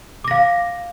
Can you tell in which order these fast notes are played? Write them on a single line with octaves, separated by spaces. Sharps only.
D6 A#6 F5